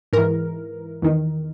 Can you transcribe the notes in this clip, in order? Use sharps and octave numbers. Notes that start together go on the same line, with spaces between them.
G#2 E3 A#4
E2 D#3